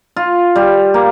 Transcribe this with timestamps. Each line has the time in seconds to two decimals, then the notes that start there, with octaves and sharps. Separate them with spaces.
0.16 F4
0.55 G3
0.94 A#3